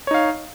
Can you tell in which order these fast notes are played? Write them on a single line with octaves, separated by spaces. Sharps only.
C#5 D#4 F5